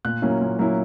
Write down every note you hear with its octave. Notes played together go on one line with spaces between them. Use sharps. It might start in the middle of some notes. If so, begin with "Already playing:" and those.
A#2 F#6
F#3 A#3 C#4 E4
A#2
F#3 A#3 C#4 E4